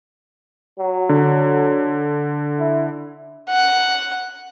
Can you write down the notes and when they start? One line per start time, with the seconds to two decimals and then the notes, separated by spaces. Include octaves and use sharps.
0.79 F#3
1.09 D3
2.59 E4
3.50 F#5